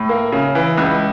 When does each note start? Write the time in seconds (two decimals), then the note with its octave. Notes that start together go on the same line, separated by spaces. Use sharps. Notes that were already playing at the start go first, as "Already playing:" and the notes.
Already playing: A2
0.09 A#3
0.32 C#3
0.55 E3
0.78 C#2